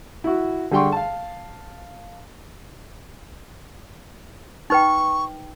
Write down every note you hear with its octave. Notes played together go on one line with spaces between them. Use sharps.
E4 F#4
D3 G3 G#4 G5 C6 C#6
F5 A5
D#4 B4 G5 C#6